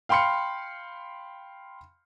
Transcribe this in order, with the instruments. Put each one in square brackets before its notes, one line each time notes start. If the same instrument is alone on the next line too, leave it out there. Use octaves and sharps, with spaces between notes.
[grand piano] F5 G5 B5 C6 F6 C#7